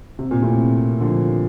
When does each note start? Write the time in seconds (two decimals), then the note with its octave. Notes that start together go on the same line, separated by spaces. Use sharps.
0.19 C3
0.31 A#2
0.43 A2 C3
1.01 D3 F3